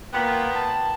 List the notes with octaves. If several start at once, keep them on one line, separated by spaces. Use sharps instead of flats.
A#2 A#3 B3 G5
A5